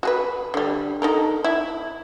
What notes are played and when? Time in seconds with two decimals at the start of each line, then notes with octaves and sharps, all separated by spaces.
0.03 F#4 G#4 B4
0.54 D3 G3
1.02 D#4 A4 A#4
1.44 E4